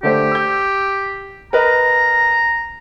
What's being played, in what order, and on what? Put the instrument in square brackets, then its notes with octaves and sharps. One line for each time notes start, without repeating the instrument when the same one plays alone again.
[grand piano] D3 A3 C5 [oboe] G4
[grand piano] E6 G6
[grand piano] A#4 B4 D#5 [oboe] A#5